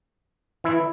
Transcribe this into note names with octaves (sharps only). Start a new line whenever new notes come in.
E3 E4